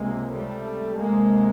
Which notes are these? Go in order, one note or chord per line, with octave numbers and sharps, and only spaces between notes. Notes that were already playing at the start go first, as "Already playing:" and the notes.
Already playing: C#2 C3 G#3 A#3
G3 A3
D2 C3 G#3 A#3